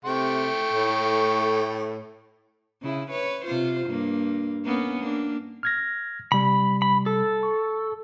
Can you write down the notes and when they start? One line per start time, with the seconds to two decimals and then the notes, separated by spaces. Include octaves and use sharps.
0.05 C3 A3 G5 C#6
0.73 A2
2.82 C#3 E4
3.11 B4 C#5
3.45 C3 F4 C5
3.87 G2 A#3
4.65 A#3 B3 C#4
4.99 A#3 D4
5.63 F6 G#6 A#6
6.32 C3 G3 B5
6.82 B5
7.06 A4
7.43 C#6